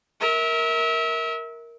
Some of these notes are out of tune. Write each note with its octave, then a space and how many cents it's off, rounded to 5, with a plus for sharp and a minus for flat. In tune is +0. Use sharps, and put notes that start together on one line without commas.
A#4 +0 E5 -30